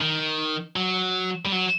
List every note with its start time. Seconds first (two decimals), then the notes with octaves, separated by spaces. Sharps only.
0.01 D#3
0.76 F#3
1.46 G3
1.52 F#3